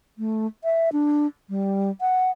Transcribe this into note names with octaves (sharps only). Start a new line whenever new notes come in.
A3
E5
D4
G3
F#5